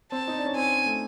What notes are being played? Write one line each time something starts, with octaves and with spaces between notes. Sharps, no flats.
C4 A5
D#4
D4
C#4
C4 G#5
A3